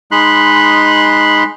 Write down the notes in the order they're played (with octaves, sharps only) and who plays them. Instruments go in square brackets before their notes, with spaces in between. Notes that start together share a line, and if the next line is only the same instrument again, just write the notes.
[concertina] G#3 D#4 B5 C6 F#6